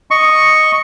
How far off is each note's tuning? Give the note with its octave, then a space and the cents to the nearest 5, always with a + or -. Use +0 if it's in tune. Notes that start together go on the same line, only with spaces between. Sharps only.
D#5 +0 C#6 +0